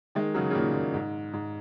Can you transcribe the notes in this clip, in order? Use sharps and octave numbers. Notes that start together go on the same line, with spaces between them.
D#3 G#3
C#3 F#3
C#3
A#2 D#3
A#2
G#2
G#2